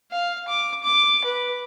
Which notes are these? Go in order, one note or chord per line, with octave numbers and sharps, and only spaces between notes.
F5
D6
D6
B4